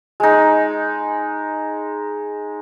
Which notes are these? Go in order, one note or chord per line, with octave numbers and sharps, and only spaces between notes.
G#3 D#4